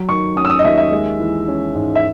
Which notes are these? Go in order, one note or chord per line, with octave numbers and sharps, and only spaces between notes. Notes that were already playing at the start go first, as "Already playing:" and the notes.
Already playing: F#3
D#3 C#6
C#4 D#6
E6
D#6
D#5
D#2 E5
E5
G#3
E3
C#4
G#2
E5